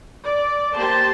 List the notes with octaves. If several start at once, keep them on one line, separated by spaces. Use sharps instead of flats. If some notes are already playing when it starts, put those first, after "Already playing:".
D5
A#3 G4 C5 A5 C6